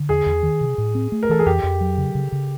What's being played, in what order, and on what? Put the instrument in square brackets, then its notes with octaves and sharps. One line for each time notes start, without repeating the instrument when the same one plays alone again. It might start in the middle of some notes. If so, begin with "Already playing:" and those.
Already playing: [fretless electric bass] D3
[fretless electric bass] E2 [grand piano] G#4
[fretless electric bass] E2
D#3
C3
A2
C4
A3
[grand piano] A#4
[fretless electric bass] E3 [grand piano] A4
[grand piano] G#4
[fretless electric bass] F2 [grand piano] G4
[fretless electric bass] F2
F#3
C#3
C#3
C#3